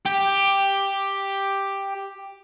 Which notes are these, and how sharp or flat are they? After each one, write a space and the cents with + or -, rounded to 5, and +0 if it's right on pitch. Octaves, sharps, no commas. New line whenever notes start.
G4 +5